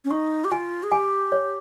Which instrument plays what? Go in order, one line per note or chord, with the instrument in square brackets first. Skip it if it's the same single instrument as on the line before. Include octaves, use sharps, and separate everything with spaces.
[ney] C#4
[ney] D#4 [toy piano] C#6
[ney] G4
[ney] F4 [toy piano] G#5
[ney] G#4
[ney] G4 [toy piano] G#5
[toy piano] C#5